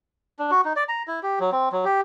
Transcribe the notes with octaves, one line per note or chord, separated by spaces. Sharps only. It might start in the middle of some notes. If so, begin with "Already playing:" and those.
D4
F#4
D#4
D5
A#5
E4
G4
F#3
C4
F#3
G4